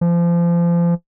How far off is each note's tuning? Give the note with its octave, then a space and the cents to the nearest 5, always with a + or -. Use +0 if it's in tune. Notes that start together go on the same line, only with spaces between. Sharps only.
F3 -30